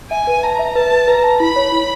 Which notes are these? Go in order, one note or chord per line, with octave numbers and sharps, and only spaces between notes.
E5 G#5
B4
A5 A#5
E5
B4 A5
B4
B4 A#5
A5
E4 B5
C#5
E4